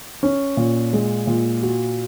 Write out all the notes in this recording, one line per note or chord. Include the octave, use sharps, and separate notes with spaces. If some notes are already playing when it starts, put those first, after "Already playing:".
C#4
A#2
G#3
A#2
F#4